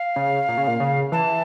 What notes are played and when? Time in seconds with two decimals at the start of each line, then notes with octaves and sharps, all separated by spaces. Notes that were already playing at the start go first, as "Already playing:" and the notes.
Already playing: F5
0.16 C#3
0.48 A#2
0.57 C#3
0.67 A#2
0.80 C#3
1.12 E3 A5